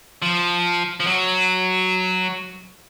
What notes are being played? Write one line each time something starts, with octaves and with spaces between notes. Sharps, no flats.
F3
F3
F#3